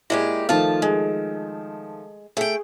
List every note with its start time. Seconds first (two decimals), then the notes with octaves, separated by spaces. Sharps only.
0.10 A#2 G#3 E4 G4
0.49 D#3 F3 A3 F4 A5
0.82 G#3
2.37 A3 G#4 G5